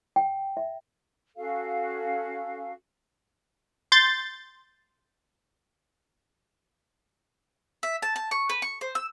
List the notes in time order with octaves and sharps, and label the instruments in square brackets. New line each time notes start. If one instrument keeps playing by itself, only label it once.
[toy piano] G5
E5
[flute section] C#4 F#4 A4 F5
[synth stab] C6 G6 A6
[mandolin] E5
A5
A5
C#6
B4
C#6
C5
E6